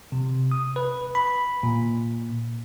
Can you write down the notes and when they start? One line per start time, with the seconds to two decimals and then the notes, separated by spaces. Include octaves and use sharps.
0.12 C3
0.51 D#6
0.76 B4
1.15 B5
1.63 A#2